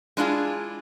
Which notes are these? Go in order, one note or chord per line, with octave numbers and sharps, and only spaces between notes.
G#3 D4 E4 F4 G#4